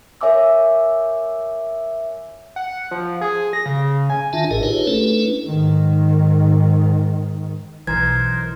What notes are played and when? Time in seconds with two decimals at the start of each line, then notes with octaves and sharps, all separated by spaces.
0.21 A#4 C#5 E5 G#5 D6 E6
2.56 F#5
2.91 F3
3.21 G#4
3.53 A#6
3.66 C#3
4.10 G#5
4.33 D#3 D4 F4 E5 A5
4.51 G#1 A2 G#4 A#4 D#5
4.63 D#4 F4 G4 G#4 B4 C#5
4.87 A3 C#4 D4 E4 A4 B4
5.47 G#2 D#3
7.87 B1 E3 D#4 A#4 C5 G#6